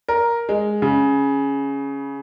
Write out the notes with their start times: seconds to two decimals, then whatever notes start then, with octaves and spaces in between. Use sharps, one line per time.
0.08 A#4
0.49 G#3
0.82 C#3